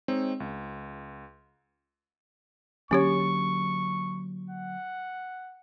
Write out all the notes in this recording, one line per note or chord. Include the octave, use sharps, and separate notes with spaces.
G#3 C4 D#4 C#5
C#2
D3 F#3 A#3 C#4 G4 C#5 C#6
F#5